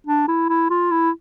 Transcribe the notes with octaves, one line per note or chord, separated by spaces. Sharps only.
D4
E4
E4
F4
E4